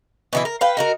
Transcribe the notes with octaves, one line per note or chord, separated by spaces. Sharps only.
B2 E3 E4
A#4
B4 F5 G5
D#4 F#4 A#4